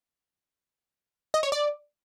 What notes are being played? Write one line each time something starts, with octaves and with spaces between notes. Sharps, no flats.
D#5
C#5
D5